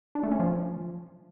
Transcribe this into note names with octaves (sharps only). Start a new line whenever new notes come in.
D4
A3
C#4
F3